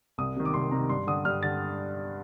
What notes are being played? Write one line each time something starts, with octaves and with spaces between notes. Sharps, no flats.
C2 D#6
C3 D#3
D6
C2 C6
C3 D#3 A#5
G2 C6
D3 D#6
G2 F6
D3 A6